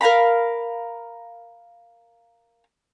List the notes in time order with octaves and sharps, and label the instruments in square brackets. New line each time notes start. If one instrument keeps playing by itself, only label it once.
[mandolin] A#4 F5 A#5 B5